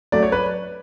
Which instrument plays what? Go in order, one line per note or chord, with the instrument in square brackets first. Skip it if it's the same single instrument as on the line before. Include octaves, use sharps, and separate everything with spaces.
[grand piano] F#3 A3 D5
C#5
B4